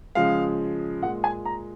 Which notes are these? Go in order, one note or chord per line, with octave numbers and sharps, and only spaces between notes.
C#3 F3 G#3 F5
A#2 G#3 F#5
G#5
A#5